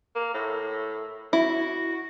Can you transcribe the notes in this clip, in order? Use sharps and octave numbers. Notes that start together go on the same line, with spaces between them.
A#3
A2
E4 F#4